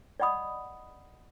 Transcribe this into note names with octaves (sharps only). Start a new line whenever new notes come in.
D5 D#5 F#5 B5 D#6